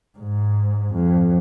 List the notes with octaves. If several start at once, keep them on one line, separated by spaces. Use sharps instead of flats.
G#2
F2